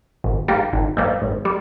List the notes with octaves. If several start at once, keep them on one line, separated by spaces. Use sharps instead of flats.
G#1
G#2 G3 A#3
G#1
G#2 G3 A#3
G#1
G3